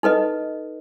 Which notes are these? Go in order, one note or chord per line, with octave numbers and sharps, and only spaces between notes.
D#4 A4 B4 D#5